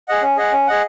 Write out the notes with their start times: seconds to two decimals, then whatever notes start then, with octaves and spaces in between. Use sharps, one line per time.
0.08 G#4 D#5 F#5
0.22 C#4
0.37 G#4 D#5 F#5
0.52 C#4
0.67 G#4 D#5 F#5